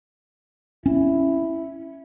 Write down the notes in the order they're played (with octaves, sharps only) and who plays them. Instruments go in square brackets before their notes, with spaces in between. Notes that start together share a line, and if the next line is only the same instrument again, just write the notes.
[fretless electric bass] C#4 [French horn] E4